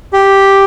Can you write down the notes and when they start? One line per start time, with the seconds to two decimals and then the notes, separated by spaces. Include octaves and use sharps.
0.13 G4